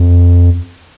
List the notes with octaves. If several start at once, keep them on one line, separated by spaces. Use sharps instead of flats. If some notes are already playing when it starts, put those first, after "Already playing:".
Already playing: F2